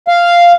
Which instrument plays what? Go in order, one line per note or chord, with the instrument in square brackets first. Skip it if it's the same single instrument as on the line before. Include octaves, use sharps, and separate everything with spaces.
[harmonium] F5